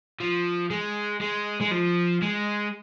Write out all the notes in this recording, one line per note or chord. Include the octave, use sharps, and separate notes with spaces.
F3
G#3
G#3
G#3
F3
G#3